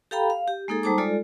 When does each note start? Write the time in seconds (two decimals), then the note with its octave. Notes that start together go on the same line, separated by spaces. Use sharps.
0.11 G4 A4 F5 G5 A#5 B5
0.30 F5
0.48 G4
0.68 G#3 A#3 D#4 G#4 A4
0.83 G3 D#4 C5 A5 A#5 D6
0.98 G#3 F4 A4 D5